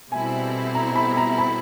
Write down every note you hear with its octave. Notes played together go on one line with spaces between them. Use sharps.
B2 G3 C4 E4 A4 G#5
A#5
B5
A#5
B5